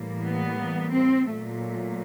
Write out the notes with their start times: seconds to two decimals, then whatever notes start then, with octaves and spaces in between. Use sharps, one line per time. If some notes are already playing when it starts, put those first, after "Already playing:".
Already playing: A2 E3 G3 A#3
0.22 B3
0.92 C4
1.27 A#2 F#3 A3